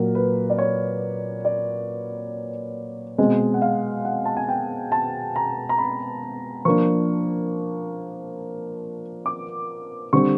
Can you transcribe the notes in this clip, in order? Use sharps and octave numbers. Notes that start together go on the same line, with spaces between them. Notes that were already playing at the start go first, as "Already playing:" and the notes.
Already playing: A#2 F#3 A#3 A#4
B4
D5
C#5
D5
B2 G#3 C4 D#5
F#5
F5
F#5
A5
G#5
G5
A5
A#5
A#5
B5
F3 A#3 D4 C#6
D6
D3 G3 C4 C#6